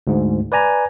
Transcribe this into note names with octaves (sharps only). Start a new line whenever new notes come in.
D2 G#2
B4 D5 G#5 A#5